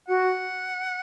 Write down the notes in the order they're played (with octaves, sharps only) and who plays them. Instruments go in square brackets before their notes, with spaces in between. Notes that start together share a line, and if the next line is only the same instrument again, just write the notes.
[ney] F#4 [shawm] F#5